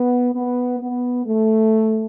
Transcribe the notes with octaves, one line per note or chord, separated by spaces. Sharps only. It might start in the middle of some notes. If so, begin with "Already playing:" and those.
Already playing: B3
B3
B3
A3